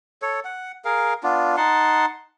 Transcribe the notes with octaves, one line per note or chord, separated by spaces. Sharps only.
A4 C#5
F#5
G#4 A#4 F5
B3 D4 F4
D#4 F#5 A5 C6